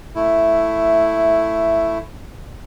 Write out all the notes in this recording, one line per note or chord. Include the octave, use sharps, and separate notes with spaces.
A3 E4